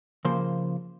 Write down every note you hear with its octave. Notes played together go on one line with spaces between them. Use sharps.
C#3 F3 A#3 C5